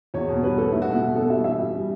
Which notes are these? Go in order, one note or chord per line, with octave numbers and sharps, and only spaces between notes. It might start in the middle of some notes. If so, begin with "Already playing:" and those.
E2 C#5
B2
G3 B4
G3 A4
A3 E4
F#4
B2
E4
B2 F#4
B2 A4
G3 E5
E3 E5
G3
G3